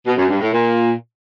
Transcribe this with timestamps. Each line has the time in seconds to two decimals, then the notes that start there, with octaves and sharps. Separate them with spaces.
0.06 B2
0.17 F#2
0.29 G2
0.40 A2
0.51 A#2